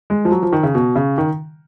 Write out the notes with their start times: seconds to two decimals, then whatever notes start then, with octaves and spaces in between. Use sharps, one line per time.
0.10 G#3
0.25 F3
0.32 F#3
0.42 F3
0.52 D#3
0.63 C#3
0.75 B2
0.96 C#3
1.18 D#3